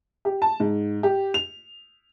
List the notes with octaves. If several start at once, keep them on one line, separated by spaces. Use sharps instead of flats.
G4
A5
G#2
G4
F7